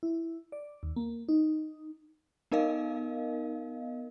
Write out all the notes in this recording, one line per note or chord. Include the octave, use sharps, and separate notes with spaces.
E4
D5
D#2
A#3
D#4
B3 D#4 A#4 D#5 F5